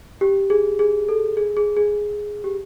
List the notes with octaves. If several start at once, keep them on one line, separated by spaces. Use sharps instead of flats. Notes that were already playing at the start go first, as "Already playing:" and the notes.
G4
G#4
G#4
A4
G#4
G#4
G#4
G4